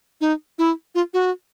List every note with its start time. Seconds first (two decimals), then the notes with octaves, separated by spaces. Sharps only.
0.21 D#4
0.59 E4
0.95 F4
1.14 F#4